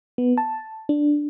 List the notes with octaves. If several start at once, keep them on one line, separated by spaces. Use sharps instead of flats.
B3
A5
D4